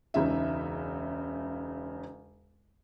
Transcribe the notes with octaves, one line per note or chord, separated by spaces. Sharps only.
E1 C#2 C#3 D#4 E5